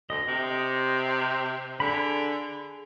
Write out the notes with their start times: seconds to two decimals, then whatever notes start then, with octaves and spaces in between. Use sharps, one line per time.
0.10 D2 D#5
0.28 C3
1.80 D3 G#4 B5